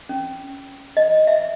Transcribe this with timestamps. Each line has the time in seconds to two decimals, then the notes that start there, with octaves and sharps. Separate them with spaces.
0.09 C#4
0.97 D#5
1.27 E5